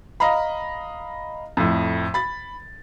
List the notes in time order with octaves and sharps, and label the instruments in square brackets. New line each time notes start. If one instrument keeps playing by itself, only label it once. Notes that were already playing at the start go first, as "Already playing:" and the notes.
[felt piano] D#5 F5 A#5 B5
F2 A2
B5 A6